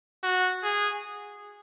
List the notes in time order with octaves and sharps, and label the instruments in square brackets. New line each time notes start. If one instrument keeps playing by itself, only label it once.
[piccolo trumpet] F#4
G#4